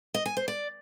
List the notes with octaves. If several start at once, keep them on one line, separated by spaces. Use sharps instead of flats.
D#5
G#5
C5
D5